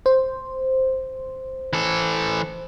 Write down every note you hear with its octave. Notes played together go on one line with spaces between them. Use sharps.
C5
E3 A4